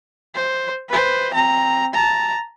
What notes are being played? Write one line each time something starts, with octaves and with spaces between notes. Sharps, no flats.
C5
B4 C5
C4 A#5
A5 A#5